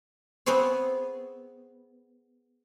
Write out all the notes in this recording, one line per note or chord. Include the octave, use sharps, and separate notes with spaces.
B3 C4 G#4 C5 C#5